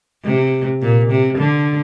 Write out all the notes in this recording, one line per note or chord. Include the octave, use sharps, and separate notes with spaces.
C3
A#2
C3
D3